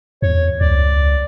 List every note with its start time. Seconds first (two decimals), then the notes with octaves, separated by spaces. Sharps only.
0.22 E2 C#5
0.61 C#2 D5